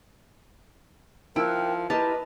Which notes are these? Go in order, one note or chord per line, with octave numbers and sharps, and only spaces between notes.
F3 E4 A#4 G5 E6 F#6
E4 G4 A#4 B4 D#5 A5